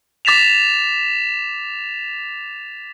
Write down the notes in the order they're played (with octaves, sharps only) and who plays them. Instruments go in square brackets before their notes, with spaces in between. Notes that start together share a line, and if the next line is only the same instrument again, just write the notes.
[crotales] D6 A6 B6 E7 F7